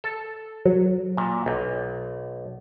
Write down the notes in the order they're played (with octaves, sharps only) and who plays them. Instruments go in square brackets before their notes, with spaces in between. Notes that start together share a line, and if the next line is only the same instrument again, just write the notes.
[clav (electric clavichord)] A4
[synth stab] F#3
[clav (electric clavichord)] A#2
B1